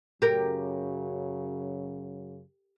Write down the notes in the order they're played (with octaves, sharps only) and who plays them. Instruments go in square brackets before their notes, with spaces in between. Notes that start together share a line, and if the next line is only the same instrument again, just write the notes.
[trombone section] F#2 C#3 F#3 [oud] G4 A#4